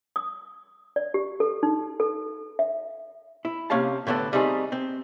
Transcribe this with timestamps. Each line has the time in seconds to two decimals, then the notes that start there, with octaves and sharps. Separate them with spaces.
0.16 D#6
0.96 D5
1.14 G4
1.40 A4
1.63 D#4
2.00 A4
2.59 E5
3.45 E4
3.70 C3 A#3 C#4 F5 A5
4.07 A2 D3 B3 D4 A4
4.33 G3 A3 C4 D#4 G#4
4.72 C4